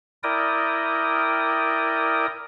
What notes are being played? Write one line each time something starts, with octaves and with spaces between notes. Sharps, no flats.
E4 A#4 D5 G5 D#6